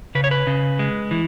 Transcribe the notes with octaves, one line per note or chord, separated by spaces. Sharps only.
C#3 B4
C#5
B4
C#3
G#3
E3